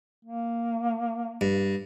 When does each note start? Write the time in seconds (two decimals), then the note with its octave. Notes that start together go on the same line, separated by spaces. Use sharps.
0.25 A#3
1.41 G2